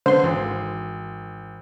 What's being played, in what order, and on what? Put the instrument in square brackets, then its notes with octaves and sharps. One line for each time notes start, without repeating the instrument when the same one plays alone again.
[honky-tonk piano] D3 B3 [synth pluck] C5 C6
[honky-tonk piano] G#1 [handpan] E3